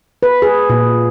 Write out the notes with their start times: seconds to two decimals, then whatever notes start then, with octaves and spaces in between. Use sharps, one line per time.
0.23 B4
0.42 G#4
0.70 A#2